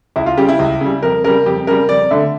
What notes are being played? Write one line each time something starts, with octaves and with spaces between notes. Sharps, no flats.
C#2 E4
F4
C#3 G3 G4
E4
C#2
C#3 G3
F2 A#4
C#3 G3 A#4
F2 G4
C#3 G3 A#4
F2 D5
D3 A3 E5